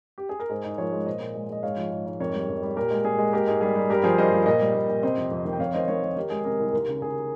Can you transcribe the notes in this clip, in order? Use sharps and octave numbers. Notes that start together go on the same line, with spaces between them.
G4
G#4
A#4
G#2 G#4 C5
G#2 D#5
F3 A#4 C#5
G#3
A#2 C5 D#5
A#2
G#3
G#3 D#5
G#2 C#5 F5
F3
G#2
G#2
F2 A#4 C#5
G3
F2
G3
A#2 G4 A#4
G#3
A#2 G#4
G#3
A#3 G4 A#4
G#2 G#4
G3 G#4
G3
G2 G4 A#4
F3 G#4 C5
G2 C5 D#5
F3
A#2 C5 D#5
G3
A#2
A#2
C3 C5 D#5
F2
F2
D#3
G5
F2 C#5 F5
D#3 C5 D#5
D#3 A#4 C#5
D#3
D#3 G4 A#4
G#3 G#4
C3 G4 A#4
C2
D#2
C#3
D#2 G#4